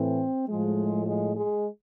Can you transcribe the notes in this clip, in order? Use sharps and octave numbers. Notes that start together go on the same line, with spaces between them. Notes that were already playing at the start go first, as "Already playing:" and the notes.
Already playing: A2 E3 C4
A2 F3 G#3
G#3
G#3